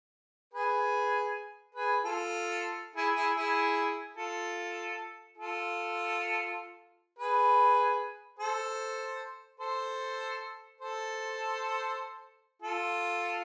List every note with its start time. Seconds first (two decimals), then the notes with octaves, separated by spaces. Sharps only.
0.54 G#4 B4
1.75 G#4 B4
2.05 F4 A4
2.96 E4 G#4
3.16 E4 G#4
3.36 E4 G#4
4.17 F4 A4
5.37 F4 A4
7.19 G#4 B4
8.39 A4 C5
9.60 A4 C5
10.81 A4 C5
12.62 F4 A4